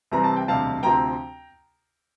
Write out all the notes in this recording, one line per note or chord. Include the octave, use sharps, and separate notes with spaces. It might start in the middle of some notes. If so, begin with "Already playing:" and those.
C2 C3 E3 G3 C4 A#5
A5
G5
E1 D2 C3 G3 F5 A5
D2 C3 F3 C4 G5 A#5